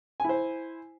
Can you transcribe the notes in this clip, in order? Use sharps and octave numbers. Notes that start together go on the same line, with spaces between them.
E4 C5 G#5